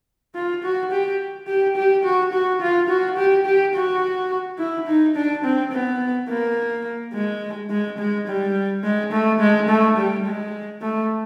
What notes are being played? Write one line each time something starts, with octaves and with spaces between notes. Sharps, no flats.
F4
F#4
G4
G4
G4
F#4
F#4
F4
F#4
G4
G4
F#4
E4
D#4
D4
C4
B3
A#3
G#3
G#3
G#3
G3
G#3
A3
G#3
A3
G3
G#3
A3